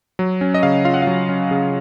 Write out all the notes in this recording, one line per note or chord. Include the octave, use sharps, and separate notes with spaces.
F#3
C#4
D#5
C#3 F5
F4 F5
F#5
F5
F#3
C#4
C#3